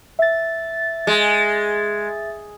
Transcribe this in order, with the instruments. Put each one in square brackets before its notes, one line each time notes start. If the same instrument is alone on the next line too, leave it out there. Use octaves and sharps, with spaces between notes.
[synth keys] E5 A6
[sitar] G#3